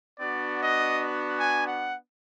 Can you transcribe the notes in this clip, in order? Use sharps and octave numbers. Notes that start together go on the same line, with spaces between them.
B3 D4 F#4 D5
D#5
G#5
F#5